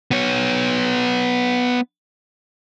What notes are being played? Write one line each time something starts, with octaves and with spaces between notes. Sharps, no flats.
B3 C#5